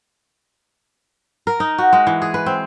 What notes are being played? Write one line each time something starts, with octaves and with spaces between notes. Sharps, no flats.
A#4
D#4
F#4
G#3
E3
G#4
B4
C4